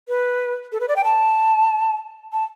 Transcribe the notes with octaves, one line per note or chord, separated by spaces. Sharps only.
B4
A4
B4
D5
G5
A5
A5